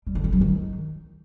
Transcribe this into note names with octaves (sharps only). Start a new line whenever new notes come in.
G3
D3
C#4
F#3
D#3